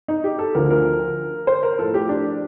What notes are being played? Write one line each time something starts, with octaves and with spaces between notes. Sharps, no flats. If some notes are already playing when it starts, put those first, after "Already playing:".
D#4
G4
A4
D2 D3 F3 A#4
A#4
C5
A#4
A2 F3 A4
G4
D4